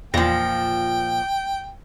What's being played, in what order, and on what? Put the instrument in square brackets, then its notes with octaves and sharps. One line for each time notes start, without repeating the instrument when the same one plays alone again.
[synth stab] E2 A#6 [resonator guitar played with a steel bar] A#2 F3 [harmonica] G5